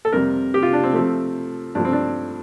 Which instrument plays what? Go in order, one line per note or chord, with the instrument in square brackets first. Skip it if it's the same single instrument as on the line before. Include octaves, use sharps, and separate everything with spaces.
[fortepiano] A4
F2 C3 G3 A#4
G4
F4
D4
C4
C3 F3 A3
G2 F3 A3 D4
C4
D4